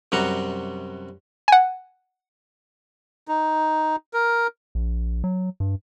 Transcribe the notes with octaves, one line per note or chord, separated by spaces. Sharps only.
F#2 C3 G3 F#4 A#5
F#5 G#5
D#4
A#4
A#1
F#3
G2